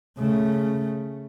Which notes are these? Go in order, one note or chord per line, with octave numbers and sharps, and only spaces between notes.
C#3 A3